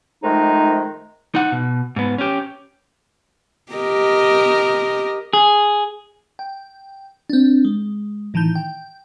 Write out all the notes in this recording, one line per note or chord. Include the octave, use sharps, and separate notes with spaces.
F2 G#2 D#3 G#3 A3 D#4
D#4 F#5
B2
G#2 B3
C#4 G4
G4 A#4 D#5
G#4
G5
C4 D4
G#3
A2 D#3 E3 A5 G6
G5